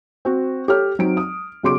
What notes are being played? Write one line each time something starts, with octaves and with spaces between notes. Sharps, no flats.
C4 F#4
G4 A4 C#5 F6
F#3 C4 D#4 D7
D#6
B1 C#3 F#4 C6 D6 D7